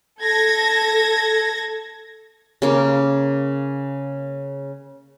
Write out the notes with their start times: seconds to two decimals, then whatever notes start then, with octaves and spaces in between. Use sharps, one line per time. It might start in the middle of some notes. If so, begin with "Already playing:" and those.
0.21 A4 G#6 A#6
2.62 C#3 A#3